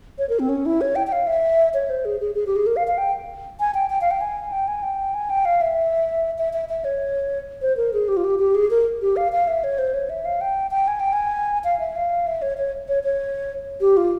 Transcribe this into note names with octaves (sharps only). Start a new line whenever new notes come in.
C#5
A#4
C4
C#4
E4
C#5
G5
G5
F5
E5
C#5
C5
G#4
G#4
G#4
G4
G#4
A#4
F5
F5
G5
G#5
G5
G5
F5
G5
G#5
G5
G#5
G5
G#5
G5
F5
E5
E5
E5
E5
C#5
C5
A#4
G#4
G4
F4
G4
G4
G#4
A#4
G4
F5
F5
E5
C#5
C5
C#5
E5
F5
G5
G5
G#5
G5
G#5
F5
E5
F5
E5
C#5
C#5
C#5
C#5
G4
F4